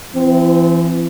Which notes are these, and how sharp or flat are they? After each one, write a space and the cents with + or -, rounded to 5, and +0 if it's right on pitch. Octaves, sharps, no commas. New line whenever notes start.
E3 +35 C4 -15